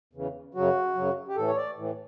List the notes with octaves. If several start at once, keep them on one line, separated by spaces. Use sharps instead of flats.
E2 C#3 E3
F#2 C#3 F#3 F#4
F#2 C#3 F#3
G4
A2 E3 A4
C#5
D5
A2 E3